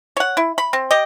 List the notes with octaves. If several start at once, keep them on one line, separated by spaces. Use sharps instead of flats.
C#5 F#5
E4
B5
C4
G4 D#5